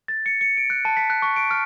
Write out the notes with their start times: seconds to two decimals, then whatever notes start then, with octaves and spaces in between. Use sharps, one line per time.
0.08 A6
0.26 C#7
0.41 C#7
0.57 D7
0.70 F#6
0.85 A5
0.97 B6
1.10 F#6
1.22 C#6
1.36 D7
1.51 F6